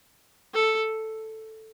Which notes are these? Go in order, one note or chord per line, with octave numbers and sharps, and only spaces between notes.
A4